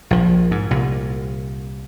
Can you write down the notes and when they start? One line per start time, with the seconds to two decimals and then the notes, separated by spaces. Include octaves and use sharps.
0.11 A#1 F3
0.51 G#2
0.71 C2 A#2